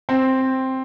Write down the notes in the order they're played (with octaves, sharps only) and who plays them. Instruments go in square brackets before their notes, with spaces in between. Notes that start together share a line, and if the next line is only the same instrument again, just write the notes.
[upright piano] C4